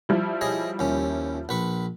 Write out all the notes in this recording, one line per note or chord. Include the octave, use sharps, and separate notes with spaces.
F3 G3 E4
G#4 C#5 D#5
D#2 C#4
A#1 B4 C#6